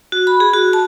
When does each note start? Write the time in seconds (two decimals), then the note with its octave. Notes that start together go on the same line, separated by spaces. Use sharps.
0.12 F#4
0.27 B5
0.40 G#4
0.53 F#4
0.73 A5